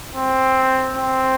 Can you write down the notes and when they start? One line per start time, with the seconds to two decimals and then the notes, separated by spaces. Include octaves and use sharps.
0.15 C4
0.96 C4